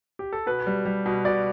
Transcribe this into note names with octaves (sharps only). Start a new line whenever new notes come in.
G4
A4
B2 B4
G3
G3
B2
B2 D5